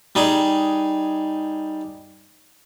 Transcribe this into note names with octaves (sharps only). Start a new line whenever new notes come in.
G3 D#4 G#4